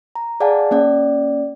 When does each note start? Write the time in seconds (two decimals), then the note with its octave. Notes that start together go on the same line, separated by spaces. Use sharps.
0.15 A#5
0.40 G#4 D5 F5 F#5 G#5 A5
0.71 A#3 C#4 D5